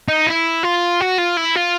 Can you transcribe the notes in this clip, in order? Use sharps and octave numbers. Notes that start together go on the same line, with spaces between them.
D#4
E4
F4
F#4
F4
E4
F4